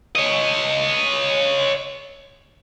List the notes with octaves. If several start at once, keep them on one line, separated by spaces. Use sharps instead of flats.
C#5 D#5